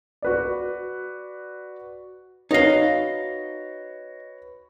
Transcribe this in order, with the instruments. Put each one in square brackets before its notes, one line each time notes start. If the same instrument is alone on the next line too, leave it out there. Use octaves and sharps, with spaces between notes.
[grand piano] F#4 B4 D5
[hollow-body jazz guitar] D#4 F5 [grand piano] F#4 B4 C#5 [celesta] D#5 A#6